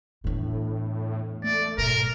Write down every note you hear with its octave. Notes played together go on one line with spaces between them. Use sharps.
E2 A2 D4
A2
A3 D5
G#2 B2 A#4